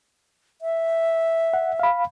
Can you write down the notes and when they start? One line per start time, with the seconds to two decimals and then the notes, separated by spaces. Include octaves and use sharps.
0.61 E5
1.54 F#5
1.80 F5 B5